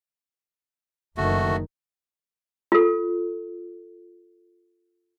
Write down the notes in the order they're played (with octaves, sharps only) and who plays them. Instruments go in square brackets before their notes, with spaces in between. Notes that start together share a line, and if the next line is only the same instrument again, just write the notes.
[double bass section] F#1 D#3 [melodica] A3 F#4
[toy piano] F4 A4